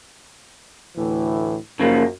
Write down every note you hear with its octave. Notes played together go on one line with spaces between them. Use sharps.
D2 A2 E3
F#2 C#3 F3 A#3